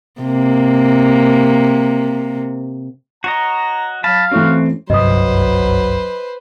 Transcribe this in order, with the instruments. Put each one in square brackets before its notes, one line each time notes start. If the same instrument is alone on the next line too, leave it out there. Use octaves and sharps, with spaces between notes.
[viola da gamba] C3 A#3
[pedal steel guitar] F#4 C#5 D#5 [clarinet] A#5
[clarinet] F#3 [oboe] F5 [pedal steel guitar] A5 B5
[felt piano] E3 A3 C#4 [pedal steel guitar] C4 [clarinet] F#4
[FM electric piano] G1 C2 F#2 [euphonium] F#3 [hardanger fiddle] B4 C5 [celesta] D#5 D#6